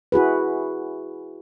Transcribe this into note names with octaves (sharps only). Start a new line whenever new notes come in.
E4 F#4 G#4 B4